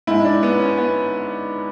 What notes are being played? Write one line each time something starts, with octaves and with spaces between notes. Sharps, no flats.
G#2 G#3 E4
D4
B3
C#4
B3